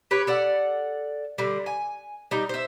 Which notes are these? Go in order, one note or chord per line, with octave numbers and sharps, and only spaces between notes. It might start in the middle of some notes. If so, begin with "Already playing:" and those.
G4 B4 C#5
A4 D5 F#5
D3 G3
G#5
G3 D#4
C5 E5